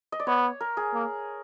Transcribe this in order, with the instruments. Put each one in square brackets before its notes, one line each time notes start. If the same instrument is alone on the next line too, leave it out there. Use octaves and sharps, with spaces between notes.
[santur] D#5
D5
[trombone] B3 [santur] C#5
[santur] A#4
G#4
[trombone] A#3